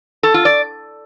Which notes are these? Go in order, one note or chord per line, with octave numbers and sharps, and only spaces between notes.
A4
F4
D5